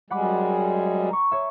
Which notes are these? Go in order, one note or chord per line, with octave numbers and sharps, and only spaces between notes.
F#2 G3 G#3 F#5 B5 D6
A#5 C#6
C#5 E5